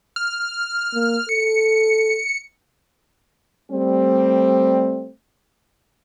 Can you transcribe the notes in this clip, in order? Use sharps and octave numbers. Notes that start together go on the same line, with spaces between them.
F6
A#3
A4 C#7
G3 A3 C4